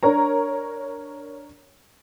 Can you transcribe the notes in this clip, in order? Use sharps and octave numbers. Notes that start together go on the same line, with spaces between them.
D4 A#4 C#5 A#5